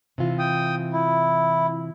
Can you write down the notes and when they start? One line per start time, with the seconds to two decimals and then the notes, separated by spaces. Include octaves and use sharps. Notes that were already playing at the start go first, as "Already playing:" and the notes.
0.18 C3 E3 F4
0.39 G5 D#6
0.93 E4